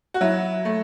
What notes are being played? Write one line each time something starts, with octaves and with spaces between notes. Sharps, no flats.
F#4
F#3 E4
A3